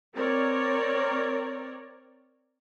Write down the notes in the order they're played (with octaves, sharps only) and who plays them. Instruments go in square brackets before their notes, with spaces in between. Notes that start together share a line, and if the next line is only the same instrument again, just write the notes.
[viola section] C4 A#4 C#5 D5